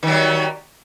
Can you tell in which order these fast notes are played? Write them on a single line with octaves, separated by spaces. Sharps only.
D#3 F#3 G3